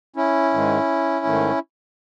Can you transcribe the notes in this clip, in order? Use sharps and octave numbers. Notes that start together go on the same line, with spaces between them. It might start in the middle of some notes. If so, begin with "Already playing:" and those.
C#4 E4
G#2 D#3 G#3
G#2 D#3 A3